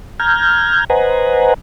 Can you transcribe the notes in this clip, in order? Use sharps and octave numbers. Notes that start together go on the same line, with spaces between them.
A#5 F6 G6 G#6
B4 C5 D#5 F#5 G#5 A#5